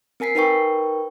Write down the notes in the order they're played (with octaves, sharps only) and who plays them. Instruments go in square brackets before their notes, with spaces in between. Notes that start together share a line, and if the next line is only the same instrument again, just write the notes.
[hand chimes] C4 A#4 G#5 B6 C7
D#4 A#4 B4 G5 C#6